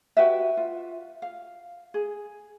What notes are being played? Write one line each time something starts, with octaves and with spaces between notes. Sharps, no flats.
F#4 G4 B4 E5
F4
F5
G#4